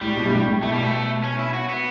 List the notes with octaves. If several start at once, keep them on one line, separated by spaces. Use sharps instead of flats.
A2 G3
B2
G2
A2
A2
B2 A3
G3
A3
C#4
E4
F#4
B3